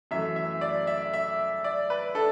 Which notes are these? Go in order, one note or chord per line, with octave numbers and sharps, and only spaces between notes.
F#2 E3 A3 E5
E5
D5
E5
E5
D5
B4
D4 A4